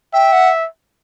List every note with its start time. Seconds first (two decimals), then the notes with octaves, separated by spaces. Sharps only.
0.13 E5 G5
0.32 F#5